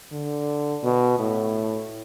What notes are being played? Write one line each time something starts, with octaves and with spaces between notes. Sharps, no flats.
D3
B2
A2